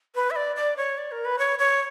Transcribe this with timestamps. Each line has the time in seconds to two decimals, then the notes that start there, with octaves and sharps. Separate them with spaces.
0.15 B4
0.31 E5
0.36 D5
0.56 D5
0.77 C#5
0.98 D5
1.12 A#4
1.25 B4
1.39 C#5
1.59 C#5